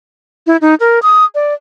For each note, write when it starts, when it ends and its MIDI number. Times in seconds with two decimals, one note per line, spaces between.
0.47 0.57 64
0.61 0.75 63
0.80 0.99 70
1.03 1.24 87
1.35 1.54 74